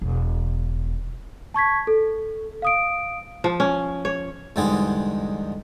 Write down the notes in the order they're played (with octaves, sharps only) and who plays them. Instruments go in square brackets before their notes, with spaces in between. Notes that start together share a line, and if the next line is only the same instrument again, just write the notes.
[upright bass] E1
[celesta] A5 C#6 G#6 B6
A4
F5 D#6 D7
[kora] F3
C#4
C#5
[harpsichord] E2 G#2 D3 G3 G#3 G#4